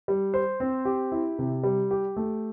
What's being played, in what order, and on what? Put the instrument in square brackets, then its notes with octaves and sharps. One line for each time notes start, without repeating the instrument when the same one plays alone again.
[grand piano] G3
C5
C4
G4
E4
C3
G3
G4
A3